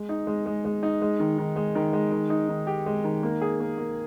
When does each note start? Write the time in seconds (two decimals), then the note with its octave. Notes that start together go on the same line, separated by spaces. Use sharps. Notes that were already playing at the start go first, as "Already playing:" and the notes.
Already playing: G#3
0.09 D#4
0.27 G#3
0.46 G#3
0.65 G#3
0.83 D#4
1.02 G#3
1.20 D#3
1.38 D#3
1.56 G#3
1.75 D#3
1.93 G#3
2.12 D#3
2.30 D#4
2.49 D#3
2.67 G4
2.86 G#3
3.04 D#3
3.23 A#3
3.41 G#4
3.60 A#3
3.78 A#3